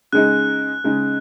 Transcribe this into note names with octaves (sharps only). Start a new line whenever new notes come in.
C#3 G#3 D#4 F#6
C#3 G#3 D#4